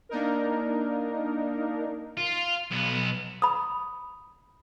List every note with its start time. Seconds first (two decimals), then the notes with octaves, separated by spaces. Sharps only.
0.09 A#3 D4 D#4 A#4
2.17 F4
2.71 B1 B3
3.42 B5 D#6